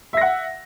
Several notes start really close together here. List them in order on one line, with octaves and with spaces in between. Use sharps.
E5 A#6 F#5